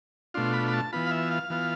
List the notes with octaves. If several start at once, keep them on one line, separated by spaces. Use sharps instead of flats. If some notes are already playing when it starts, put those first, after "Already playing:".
B2 A3 D4 F4 C6
B5
B5
A5
E3 B3 F4 B5
F5
E5
F5
E3 B3 F4